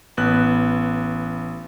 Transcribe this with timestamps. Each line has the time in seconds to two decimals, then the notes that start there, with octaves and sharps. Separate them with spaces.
0.17 A1 B3 F#6